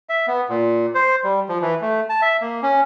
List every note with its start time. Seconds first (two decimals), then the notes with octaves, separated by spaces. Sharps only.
0.09 E5
0.27 B3
0.49 A#2
0.95 C5
1.24 G3
1.49 F3
1.62 E3
1.81 A3
2.09 A5
2.22 E5
2.41 A#3
2.62 C#4